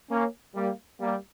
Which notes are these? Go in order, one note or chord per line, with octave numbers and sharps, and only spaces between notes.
A#3 C#4
G3 A#3
G3 A#3